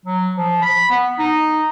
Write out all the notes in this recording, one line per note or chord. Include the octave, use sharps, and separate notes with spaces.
F#3
F3
B5
B3
D#4